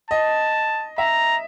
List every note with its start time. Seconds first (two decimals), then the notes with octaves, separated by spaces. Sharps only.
0.10 D#5 A5
0.98 E5 A#5